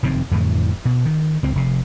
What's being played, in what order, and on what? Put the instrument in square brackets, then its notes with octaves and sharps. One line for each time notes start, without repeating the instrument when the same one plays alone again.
[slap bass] F1 F#2 D#3 C4
F2 A2 D3 E3
B2
D#3
C#2 C4
F1 C3